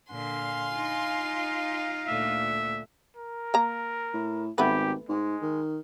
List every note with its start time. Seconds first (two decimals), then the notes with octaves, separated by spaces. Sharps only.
0.11 A#2 D3 F5 G#5 C6
0.74 D#4 F4
2.08 D2 A#2 D3 E5
3.17 A#4
3.54 A#3 A#5
4.14 A2
4.58 G#1 A3 B3 G4 B4
5.09 G#2 G#3
5.42 D#3